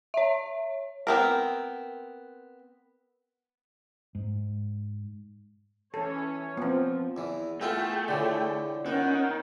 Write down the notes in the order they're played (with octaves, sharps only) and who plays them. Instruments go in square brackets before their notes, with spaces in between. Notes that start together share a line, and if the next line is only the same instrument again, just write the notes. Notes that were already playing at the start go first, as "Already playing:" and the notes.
[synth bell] C#5 E5
[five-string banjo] B3 C4 A#4
[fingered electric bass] G#2
[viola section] E3 C#4 C#5 [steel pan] A4
[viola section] F3 [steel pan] B3 C4
[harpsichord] E2 E3
[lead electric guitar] A3 [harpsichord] B3 E4 F4 [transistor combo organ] G#4 G5
[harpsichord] D3 E3 [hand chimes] E4 F4 C#5
[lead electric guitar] D#3 [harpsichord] B3 [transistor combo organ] C#4 F#5